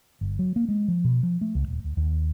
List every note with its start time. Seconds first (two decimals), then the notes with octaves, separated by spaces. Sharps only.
0.21 G1
0.39 F#3
0.56 A#3
0.69 G#3
0.88 F3
1.04 B2
1.23 F3
1.41 A3
1.55 C#2
1.68 D#1
1.84 D2
1.97 D#2